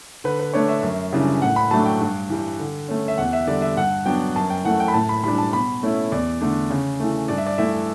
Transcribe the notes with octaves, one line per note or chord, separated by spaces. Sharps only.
D3 B4
B4
A3 D4 C#5
E5
F#2
C#3 E3 G3 D4
A2 F#5
B5
F#3 A3 D4 A5
G5
G2
E3 G3
D3
A3 C#4
E5
E2 F#5
E5
D3 G3 D5
E5
G2 F#5
F#3 B3 D4 G5
F#2 A5
G5
E3 A3 F#5
G5
B5
A2 A5
B5
E3 G3 D4 B5
A5
B2 B5
A3 C#4 E4
E2 D5
D3 A3 D4
C#3
E3 A3
G2 D5
E5
D5
E3 A3 E4 E5